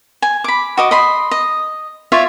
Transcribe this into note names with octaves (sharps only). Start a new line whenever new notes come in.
G#5
B5 D6
F#4 D#5 D6
D#5 B5 C6
D#5
F4 C#5 D5 E5